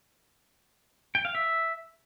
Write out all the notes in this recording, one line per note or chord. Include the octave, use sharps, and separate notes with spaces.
G5
F5
E5